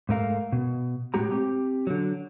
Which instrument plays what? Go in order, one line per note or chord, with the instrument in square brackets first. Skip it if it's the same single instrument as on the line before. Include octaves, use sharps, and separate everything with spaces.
[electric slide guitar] G#2 A3 A#4 F5
B2
A2 G#3 F#4 G4 A#5
C4 G4
D3 F#3